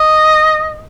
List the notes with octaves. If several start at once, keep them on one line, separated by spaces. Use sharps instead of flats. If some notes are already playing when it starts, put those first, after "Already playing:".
Already playing: D#5